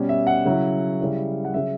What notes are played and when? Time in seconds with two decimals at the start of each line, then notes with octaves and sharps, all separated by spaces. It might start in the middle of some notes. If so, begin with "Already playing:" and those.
Already playing: B2 G3 C#4
0.09 E5
0.27 F#5
0.45 C#3 F#3 C#4 E4
1.00 C#3 G3 C#4 E4
1.45 F#5
1.54 C#3 F#3 E5